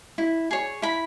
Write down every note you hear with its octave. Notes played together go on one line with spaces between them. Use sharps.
E4
G#4 C#5
E4 B5